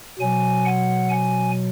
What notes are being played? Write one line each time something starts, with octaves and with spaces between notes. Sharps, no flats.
B2 F#3 G#5
F#5
G#5